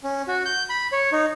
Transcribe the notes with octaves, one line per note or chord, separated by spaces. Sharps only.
C#4
F#4
G6
B5
C#5
D#4